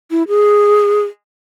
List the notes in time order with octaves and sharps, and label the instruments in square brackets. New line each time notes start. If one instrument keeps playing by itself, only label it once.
[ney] E4
G#4